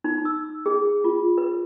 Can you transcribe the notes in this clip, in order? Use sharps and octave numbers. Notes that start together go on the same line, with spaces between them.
D#4
E6
G#4
F4
B4